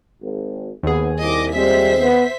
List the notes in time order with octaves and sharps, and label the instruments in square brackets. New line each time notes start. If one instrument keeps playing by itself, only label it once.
[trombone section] G#1
[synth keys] D#2 G#4 [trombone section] B3
[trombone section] C2 [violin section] D#5 D6
[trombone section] F2 G#3 C4 [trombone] G3 [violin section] C5 E5 B6
[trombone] B3